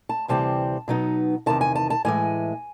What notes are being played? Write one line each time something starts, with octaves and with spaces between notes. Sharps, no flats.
A5
D2 C3 E3 G3 C4 A5
B2 F#3 B3 D#4
E2 C3 D#3 A5
G#5
A5
A5
A2 E3 G#3 G#5